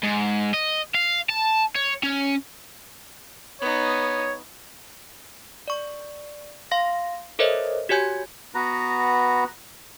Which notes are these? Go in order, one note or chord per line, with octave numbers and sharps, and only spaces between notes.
G#2
D#5
F5
A5
C#5
C#4
B3 D#4 C#5
D5 C#6
F5 C6 A#6
A4 A#4 C5 C#5 D#5 E5
F#4 G4 C#5 G#5 G6 G#6
B3 F#4 B4 A#5